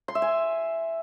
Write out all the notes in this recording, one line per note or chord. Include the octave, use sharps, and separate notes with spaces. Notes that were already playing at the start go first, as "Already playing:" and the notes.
C6
E5
G#5